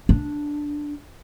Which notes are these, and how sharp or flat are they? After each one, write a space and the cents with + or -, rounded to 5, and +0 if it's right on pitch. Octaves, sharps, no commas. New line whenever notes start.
D4 +0